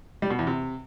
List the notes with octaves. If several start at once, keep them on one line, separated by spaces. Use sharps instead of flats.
G3
B2
E2
C3